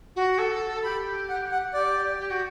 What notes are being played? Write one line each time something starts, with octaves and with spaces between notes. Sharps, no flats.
F#4
A4
G4 B5
F#5
F#5
G4 D5
G4
F#4